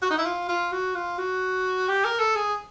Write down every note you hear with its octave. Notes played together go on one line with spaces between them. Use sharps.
F#4
D#4
E4
F4
F4
F#4
F4
F#4
G4
A#4
A4
G#4